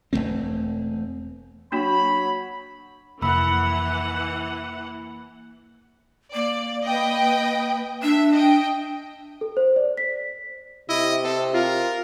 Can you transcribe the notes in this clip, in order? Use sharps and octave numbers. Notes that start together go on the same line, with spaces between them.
E1 G2 A3 C4
F#3 A#3 D4 F#4 C#5 B5
F1 E3 A#3 F#5 B5 E6
A#3 D5
B4 D#5 G5
D4 E5
D#5 G5
A4
C5
D5
B6
C3 E4 D#5
C4 A4
F4 A#4